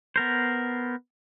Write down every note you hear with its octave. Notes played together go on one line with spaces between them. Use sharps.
B3 A#4 C5